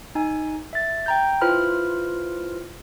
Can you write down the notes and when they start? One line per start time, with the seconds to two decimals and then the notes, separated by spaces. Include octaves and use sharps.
0.15 D#4 G#5
0.73 E5 A6
1.06 G5 A#5 G6
1.41 E4 F4 B4 C5 B5 F6